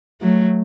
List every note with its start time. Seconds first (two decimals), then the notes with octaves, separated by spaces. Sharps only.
0.22 F#3 A3